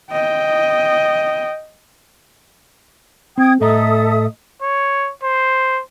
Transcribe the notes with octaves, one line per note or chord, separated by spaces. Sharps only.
D#5 G5
C4 G5 D#6 G#6
A2 A4 D#5 E5 A#5 D#6
C#5
C5